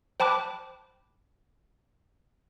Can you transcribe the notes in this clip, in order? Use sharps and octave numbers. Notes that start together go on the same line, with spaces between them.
C5 G5 A5 B5 D6 F#6